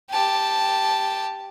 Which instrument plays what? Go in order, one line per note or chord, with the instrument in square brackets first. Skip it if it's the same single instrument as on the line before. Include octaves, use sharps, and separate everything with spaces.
[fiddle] G4 A5